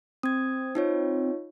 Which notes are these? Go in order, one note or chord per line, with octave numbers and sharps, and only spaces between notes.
C4 D#6 G#6
D#4 F4 C#5